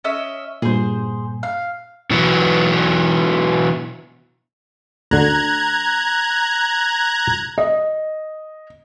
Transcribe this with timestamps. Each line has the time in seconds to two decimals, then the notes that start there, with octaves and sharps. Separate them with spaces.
0.04 C#4 D#5 E5
0.62 G2 A#2 G#4 C5
1.43 F5
2.10 B2 E3 F#3 B3
5.11 D2 D3 A#5 F#6 G#6
7.58 D#5